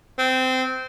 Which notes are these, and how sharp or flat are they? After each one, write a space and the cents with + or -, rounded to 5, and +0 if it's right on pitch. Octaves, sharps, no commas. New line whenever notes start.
C4 -20